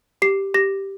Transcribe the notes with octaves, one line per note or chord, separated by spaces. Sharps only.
G4 C7
G4 A#6